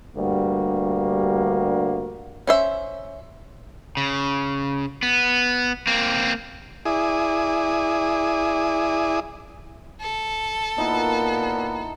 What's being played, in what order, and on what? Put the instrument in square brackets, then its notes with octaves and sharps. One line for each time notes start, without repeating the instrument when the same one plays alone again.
[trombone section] D2 G2 G3 A#3 F#4
[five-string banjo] C#4 C5 E5
[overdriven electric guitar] C#3
B3
A#3 C4
[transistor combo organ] E4 G#4 D5 D#6
[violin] A4
[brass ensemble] A#2 A#3 [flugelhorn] B3 [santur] D#4 E4